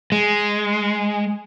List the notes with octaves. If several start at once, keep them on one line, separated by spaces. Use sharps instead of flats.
G#3